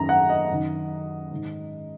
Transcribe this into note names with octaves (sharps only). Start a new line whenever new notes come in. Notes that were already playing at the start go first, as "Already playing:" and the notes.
Already playing: F#2 D#3 A#5
F#5
D#5
F#2 D#3
G#2 D#3